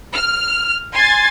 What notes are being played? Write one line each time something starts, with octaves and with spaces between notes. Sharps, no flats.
F6
G#5 C6 G#6 A6